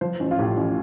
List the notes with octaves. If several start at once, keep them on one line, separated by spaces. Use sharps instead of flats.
F3 C5
A1
F4
A2 G4
A1